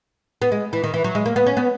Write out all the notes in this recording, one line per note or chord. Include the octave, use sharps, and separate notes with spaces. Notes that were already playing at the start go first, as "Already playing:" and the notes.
B3
G#3
E3
D#3
E3
F#3
G#3
A#3
B3
C#4
B3